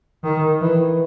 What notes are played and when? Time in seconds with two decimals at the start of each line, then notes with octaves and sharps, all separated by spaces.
0.23 D#3
0.61 E3